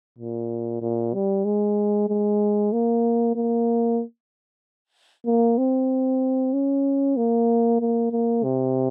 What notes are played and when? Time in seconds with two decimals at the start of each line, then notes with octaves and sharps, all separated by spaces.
0.19 A#2
0.82 A#2
1.14 G3
1.45 G#3
2.09 G#3
2.72 A#3
3.35 A#3
5.26 A#3
5.58 C4
6.53 C#4
7.17 A#3
7.80 A#3
8.12 A#3
8.43 C3